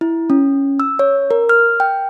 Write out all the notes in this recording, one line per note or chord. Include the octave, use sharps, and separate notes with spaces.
E4
C#4
E6
C#5
A#4
F6
G5